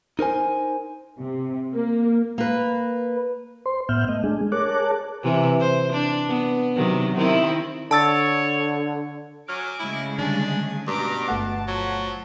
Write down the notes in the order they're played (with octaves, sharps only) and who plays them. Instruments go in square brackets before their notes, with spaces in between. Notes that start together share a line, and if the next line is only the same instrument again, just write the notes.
[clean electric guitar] D#4 A#4 C5 G#5
[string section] C3
A#3
[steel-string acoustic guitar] A#3 B4
[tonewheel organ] C5 C6
A2 B3 E5 F#5 F6 G6
A3 D#5
G#3 A3 D4 G#4
G#4 A#4 C#5 A5 D6 F#6
[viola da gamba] C3 E3
C5
D4
B3
C3 D#3 F#3
D#3 C4 E4
[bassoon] D3 [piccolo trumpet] C#5 [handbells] A5 E6 A6
[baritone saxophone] F#3 [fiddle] G#5 D6 [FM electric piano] F6
[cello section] C#3 G#3 A3 [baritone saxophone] E4
[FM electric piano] D3 D#3 G3 [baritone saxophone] D4 [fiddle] G#5
[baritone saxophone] G2 [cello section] B2 [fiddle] A#5 D6
[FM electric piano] G1 A3 F#5 [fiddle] A5
[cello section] F3 [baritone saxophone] F#3